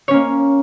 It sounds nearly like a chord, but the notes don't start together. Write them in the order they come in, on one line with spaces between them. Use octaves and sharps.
C#5 C#4 A#3